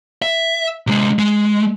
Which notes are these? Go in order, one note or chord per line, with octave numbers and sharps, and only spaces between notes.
E5
C3 G#3
G#3